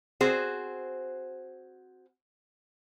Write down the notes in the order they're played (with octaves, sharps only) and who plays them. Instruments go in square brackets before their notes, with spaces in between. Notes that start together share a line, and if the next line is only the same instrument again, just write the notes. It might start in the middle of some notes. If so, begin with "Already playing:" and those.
[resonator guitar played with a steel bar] C4 F#4 G#4 C5